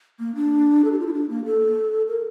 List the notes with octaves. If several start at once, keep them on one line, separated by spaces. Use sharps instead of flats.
A#3
D4
A4
G4
F4
E4
D4
A#3
A4
A#4